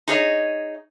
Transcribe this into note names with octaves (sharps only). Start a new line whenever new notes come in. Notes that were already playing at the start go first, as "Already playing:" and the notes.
D#4 G#4 C#5 D#5